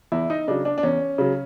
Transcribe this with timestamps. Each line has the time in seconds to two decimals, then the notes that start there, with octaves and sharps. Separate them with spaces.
0.12 E2 E4
0.30 D#4
0.48 C#3 F#3 D4
0.65 D4
0.78 D4
0.83 E2 C#4
1.18 C#3 F#3